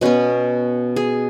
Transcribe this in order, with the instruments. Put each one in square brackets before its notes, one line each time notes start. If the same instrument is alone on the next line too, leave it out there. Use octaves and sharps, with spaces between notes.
[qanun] B2 B3 C#4
G#4